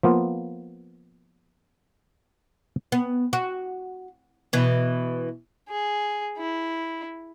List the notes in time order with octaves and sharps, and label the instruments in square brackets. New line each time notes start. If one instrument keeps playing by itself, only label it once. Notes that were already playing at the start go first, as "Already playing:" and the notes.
[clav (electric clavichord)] F3 A#3 B3 F4
[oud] B3
F#4
B2 E3
[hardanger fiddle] G#4
E4